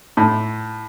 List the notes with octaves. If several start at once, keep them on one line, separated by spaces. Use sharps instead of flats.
A2